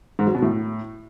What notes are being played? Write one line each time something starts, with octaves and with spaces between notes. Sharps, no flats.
G#2
F#3
B2
A2